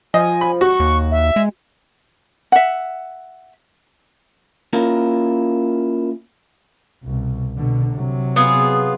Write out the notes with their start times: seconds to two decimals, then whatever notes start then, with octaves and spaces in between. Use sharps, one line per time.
0.14 F3 D#5 G#5
0.41 B5
0.61 F#4 C#6
0.80 D#2
1.11 E5
1.36 G#3
2.52 E5 F#5
4.73 A#3 C#4 E4 F4 A#4
7.04 C2 B2
7.57 B2 D3
7.94 C3 F#3
8.36 B3 F4 G#4